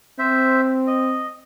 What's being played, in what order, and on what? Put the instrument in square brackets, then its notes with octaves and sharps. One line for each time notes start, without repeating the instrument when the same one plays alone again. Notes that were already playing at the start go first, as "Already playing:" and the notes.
[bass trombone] C4 [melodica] C5 E5
[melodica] D#5